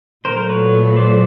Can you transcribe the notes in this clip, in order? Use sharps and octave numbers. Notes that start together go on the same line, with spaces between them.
A#2 F#3 A3 A#4 C5
A#4 C5
B4 C#5
C5 D5